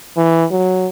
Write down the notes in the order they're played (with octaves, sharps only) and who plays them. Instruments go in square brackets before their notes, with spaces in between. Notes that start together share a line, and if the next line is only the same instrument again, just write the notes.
[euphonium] E3
F#3